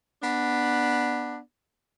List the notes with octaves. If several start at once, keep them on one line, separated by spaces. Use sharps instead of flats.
B3 D4